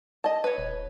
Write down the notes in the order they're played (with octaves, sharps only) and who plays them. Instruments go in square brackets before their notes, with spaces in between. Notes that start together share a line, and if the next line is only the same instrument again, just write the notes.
[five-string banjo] D#5 A5
B4 C#5
[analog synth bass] D#1